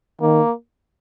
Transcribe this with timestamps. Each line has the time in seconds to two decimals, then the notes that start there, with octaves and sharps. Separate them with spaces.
0.21 D#3 A#3